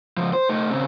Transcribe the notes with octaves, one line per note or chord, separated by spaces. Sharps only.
C#2 F3
C5
A3 D#4
C#3 C4